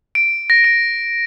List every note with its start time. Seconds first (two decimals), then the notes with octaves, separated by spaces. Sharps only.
0.15 D7
0.50 A#6
0.64 D7